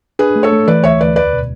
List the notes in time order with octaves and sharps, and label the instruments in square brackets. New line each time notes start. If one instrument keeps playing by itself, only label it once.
[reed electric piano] D4 [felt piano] G#4 B4
[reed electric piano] A3
[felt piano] A4 C#5
[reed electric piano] A3
[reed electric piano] E3 [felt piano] B4 D5
[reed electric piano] D2 [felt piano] C#5 E5
[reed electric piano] D2 [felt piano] B4 D5
[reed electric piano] E2 [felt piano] B4 D5
[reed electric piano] B2